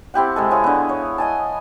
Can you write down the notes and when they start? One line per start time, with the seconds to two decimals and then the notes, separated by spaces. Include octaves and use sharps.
0.14 C4 E4 G4 F#5
0.36 C3 G#3 A4
0.50 E4 G#4 C#5 F5
0.64 D3 B3
0.89 C#5
1.18 D#5 G#5 A5